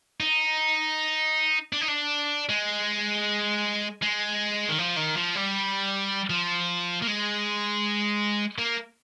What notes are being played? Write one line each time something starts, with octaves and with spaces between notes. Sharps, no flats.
D#4
D4
D#4
D4
G#3
G#3
D#3
F3
D#3
F3
G3
F3
A#3
G#3
A#3